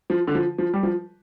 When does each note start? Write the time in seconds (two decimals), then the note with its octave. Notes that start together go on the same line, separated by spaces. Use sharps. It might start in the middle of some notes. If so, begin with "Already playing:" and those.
0.10 F3
0.27 D3
0.35 F3
0.58 F3
0.73 G3
0.83 F3